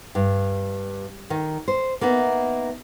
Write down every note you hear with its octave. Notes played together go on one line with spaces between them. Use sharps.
G2
D#3
C5
A#3 B3 D#4 E5